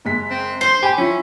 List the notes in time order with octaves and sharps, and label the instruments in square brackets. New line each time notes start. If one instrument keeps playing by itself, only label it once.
[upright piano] F#1 G#3 B6
[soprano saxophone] C4
[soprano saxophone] C5 [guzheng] C6
[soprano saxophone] G4 [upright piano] G#5 B5
[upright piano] F3 E4 B6 [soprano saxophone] C#4